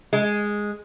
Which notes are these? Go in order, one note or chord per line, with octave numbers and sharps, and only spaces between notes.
G#3